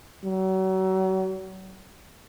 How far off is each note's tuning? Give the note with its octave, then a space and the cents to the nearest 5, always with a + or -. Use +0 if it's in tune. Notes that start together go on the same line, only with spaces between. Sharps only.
F#3 +35